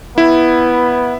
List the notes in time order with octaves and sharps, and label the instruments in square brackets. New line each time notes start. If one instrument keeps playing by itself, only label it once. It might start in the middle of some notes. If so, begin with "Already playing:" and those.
[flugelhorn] B3 [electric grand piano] E4